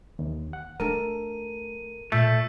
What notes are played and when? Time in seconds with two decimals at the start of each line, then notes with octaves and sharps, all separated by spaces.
0.19 D#2
0.53 F#5
0.80 A3 D4 A4 A#4 D#7
2.12 A#2 A3 E6 G6 B6